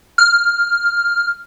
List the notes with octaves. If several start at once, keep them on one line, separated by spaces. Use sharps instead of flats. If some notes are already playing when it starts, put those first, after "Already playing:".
F6